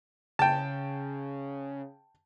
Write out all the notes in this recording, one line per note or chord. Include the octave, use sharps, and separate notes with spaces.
C#3 G5 A5